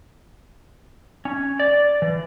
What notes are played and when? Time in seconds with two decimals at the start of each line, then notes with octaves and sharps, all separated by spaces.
1.25 C#4
1.60 D5
2.02 E3